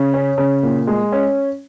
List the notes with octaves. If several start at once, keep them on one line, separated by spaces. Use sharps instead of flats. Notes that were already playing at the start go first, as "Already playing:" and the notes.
Already playing: C#3
C#4
C#3
A#2
G#3
C#4